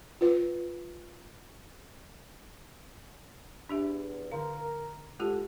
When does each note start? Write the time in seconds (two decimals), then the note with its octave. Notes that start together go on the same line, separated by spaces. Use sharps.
0.21 F4 B4
3.69 E2 D4 G4 E5
4.32 D3 A#4 F5 A#5
5.19 E3 G#3 A3 F4 G4